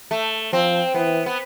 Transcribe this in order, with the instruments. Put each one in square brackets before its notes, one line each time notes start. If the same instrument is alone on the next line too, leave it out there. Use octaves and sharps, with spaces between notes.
[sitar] A3
[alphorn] F3 [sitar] C4
[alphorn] E3 [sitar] B3
[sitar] B3